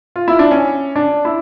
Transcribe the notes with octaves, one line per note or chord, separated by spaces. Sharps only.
F4
E4
D4
C#4
D4
E4